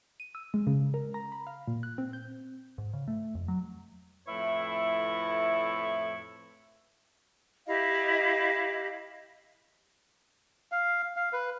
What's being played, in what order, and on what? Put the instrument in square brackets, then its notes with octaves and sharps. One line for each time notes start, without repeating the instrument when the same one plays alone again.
[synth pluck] D#7
E6
G#3
C#3
A#4
A#5
B5
F5
A#2
F#6
C4
G6
[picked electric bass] G#2
C#3
A3
F2
F#3
[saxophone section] F2 A2 E4 B4 C#5 E5
[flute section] E4 G4 D#5 F5
[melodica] F5
F5
B4